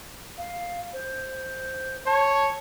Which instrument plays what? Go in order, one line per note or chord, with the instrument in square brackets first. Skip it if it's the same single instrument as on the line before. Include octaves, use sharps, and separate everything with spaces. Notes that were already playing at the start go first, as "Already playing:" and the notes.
[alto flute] F5
C5
[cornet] C#5 [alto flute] A5